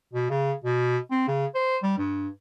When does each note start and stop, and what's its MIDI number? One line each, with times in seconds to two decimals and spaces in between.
0.13 0.27 47
0.30 0.53 49
0.64 0.98 47
1.11 1.28 60
1.28 1.46 49
1.55 1.77 72
1.83 1.98 55
1.98 2.29 43